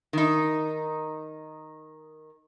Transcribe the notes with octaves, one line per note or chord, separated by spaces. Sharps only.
D#3 D#4